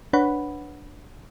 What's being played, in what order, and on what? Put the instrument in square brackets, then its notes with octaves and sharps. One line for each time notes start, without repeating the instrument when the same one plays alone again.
[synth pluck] D4 B4 C#5 F#5 B5